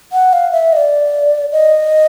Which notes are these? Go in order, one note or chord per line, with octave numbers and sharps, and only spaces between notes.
F#5
F5
E5
D#5
D5
D#5